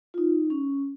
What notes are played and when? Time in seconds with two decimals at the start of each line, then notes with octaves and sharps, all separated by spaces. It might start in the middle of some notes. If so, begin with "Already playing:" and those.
0.14 F4
0.18 D#4
0.50 C#4